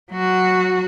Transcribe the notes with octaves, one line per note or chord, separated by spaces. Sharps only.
F#3 F#4